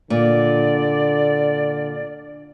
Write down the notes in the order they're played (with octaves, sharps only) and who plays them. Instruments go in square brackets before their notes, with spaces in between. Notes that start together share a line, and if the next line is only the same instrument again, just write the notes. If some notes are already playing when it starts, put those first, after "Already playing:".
[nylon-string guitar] A#2 [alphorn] D3 [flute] D5